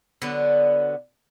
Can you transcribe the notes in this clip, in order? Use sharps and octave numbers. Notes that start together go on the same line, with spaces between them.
D3 F#3 B3